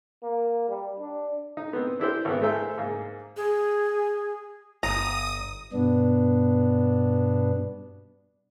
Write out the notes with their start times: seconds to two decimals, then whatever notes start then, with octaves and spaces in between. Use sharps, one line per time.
0.23 A#3
0.69 G3
0.99 D4
1.57 D#4
1.73 B3 C4
2.00 D4 E4 G4 C5
2.25 G#1 B3
2.41 G#3 A3 A4 A#4 C5 E5
2.78 G#2 A#3
3.37 G#4
4.83 G1 A#5 D#6
5.73 G2 B2 B3 D4